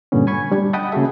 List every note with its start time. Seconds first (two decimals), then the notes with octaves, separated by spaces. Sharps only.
0.12 G2 A#2 D3 B3 C#4
0.27 G#5 B5 C#6 G#6
0.51 G3 D4
0.73 D#5 F#5 G5 A5 B5 D#6
0.92 C#3 A#3 F#4 G#4 E5